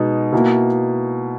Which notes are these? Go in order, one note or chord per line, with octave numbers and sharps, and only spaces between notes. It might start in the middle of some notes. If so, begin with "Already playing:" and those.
Already playing: B2 G#3 D#4
B2 A#3 E4